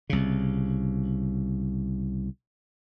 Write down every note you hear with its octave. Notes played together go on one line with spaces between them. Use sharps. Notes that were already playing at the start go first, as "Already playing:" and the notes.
C2 C#3